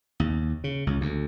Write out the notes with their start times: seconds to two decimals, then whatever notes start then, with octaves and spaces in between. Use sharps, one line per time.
0.20 D#2
0.64 C#3
0.87 C#2
1.01 D2